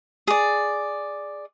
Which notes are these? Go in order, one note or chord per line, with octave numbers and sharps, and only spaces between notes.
G#4 D5